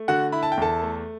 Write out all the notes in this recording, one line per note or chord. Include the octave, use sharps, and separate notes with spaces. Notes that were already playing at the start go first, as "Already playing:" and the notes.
Already playing: A3
D3 F#4 F#5
E4 B5
A5
G5
E2 A4 A5
A3